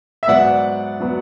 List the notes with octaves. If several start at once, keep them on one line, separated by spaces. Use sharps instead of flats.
E5
G#2 F#3 B3 D5 F#5
F#3 B3